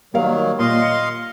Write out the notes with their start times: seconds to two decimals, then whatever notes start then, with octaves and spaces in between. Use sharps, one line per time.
0.14 D#3 F#3 G3 A#3 F5
0.59 A#2 D#5 F5 C6
0.82 C#7